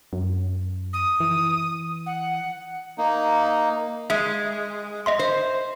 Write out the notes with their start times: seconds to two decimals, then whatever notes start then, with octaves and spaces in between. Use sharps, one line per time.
0.13 F#2
0.93 D#6
1.20 E3
2.06 F#5
2.98 A#3 D#4
4.10 G#3 E5
5.06 D#5 E5 C6
5.19 C5